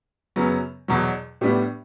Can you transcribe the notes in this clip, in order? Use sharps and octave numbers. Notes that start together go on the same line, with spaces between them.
F#2 C#3 F#3 B3
E2 B2 F#3
A2 G3 B3 D4